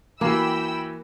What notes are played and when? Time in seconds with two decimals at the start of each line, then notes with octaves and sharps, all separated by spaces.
0.21 E3 A#3 F#4 G5 B5 E6